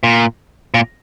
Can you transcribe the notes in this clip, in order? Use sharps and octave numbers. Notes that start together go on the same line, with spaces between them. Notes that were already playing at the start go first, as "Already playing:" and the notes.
A#2
A#2